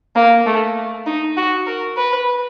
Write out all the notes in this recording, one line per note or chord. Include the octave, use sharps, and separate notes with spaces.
A#3
A3
D#4
F#4
A#4
B4